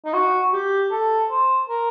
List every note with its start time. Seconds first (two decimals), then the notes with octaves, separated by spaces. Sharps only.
0.05 D#4
0.13 F#4
0.53 G4
0.91 A4
1.30 C5
1.69 A#4